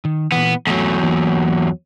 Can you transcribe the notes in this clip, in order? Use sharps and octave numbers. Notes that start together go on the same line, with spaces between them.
D#3
A#2 E3 B3
E2 F#3 A3
E3 A#3